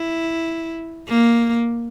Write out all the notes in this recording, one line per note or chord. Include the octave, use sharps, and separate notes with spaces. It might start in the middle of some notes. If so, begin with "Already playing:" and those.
Already playing: E4
A#3